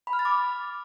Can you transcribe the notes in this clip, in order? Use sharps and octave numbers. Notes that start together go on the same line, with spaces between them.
B5
F6
A6
D6